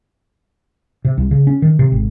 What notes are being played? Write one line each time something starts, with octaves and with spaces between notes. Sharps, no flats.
C3
C2
C#3
C#4
D#3
C3
G#1